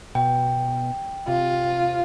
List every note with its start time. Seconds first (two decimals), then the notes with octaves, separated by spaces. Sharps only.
0.15 B2 G5
1.28 C3 F4